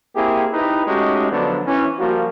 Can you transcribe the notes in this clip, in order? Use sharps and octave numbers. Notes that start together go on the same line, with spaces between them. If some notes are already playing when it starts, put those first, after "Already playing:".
A#3 C4 E4 G4 G#4
D#4 E4 G4 B4
G#3 A3 C#4 D#4 F#4 G4
D3 F3 F#3 B3 D4
E3 C#4
F3 G3 A#3 F#4